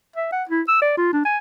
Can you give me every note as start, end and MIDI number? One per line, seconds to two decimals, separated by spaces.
0.16 0.29 76
0.32 0.44 78
0.49 0.62 64
0.68 0.79 88
0.82 0.94 74
0.98 1.09 65
1.13 1.25 62
1.25 1.38 80